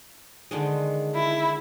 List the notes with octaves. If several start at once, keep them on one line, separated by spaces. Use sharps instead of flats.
D3 D#3 G#3
E4